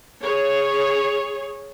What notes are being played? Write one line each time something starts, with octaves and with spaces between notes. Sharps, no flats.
G#4 C#5